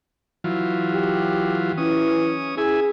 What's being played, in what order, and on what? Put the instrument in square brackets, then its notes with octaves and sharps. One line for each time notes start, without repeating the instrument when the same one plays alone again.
[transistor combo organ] E3 F#3 F4
[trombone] G4
[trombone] E3 [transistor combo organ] C#4 D#6
[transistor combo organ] E4 G#5 [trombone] G#4